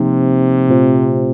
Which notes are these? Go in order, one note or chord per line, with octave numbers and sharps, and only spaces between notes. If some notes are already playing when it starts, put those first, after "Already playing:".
Already playing: C3 F3 A#3 D#4
A#2 A3 C4 F4 C5